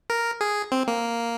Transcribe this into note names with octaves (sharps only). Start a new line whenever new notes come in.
A#4
G#4
C4
A#3